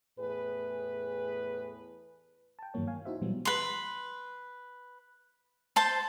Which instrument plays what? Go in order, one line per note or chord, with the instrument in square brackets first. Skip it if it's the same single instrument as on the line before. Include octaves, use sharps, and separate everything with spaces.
[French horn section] E2 A2 G#4 B4
[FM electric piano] G5 A5
G2 D#3 E3 F#3 A#3 C#5
C#5 F5 G#5
D#4 E4 F#4 C5 E5
A#2 E3 F#3 G3 B3
[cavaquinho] B4 C6
C5 A5 C6